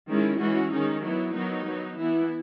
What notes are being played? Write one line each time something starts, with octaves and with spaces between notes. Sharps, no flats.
D#3 G#3 C#4 E4
E3 G#3 C#4 F#4
D#3 G#3 C#4 D#4
F#3 B3 E4
D#3 F#3 B3 D#4
F#3 B3
E3 B3 E4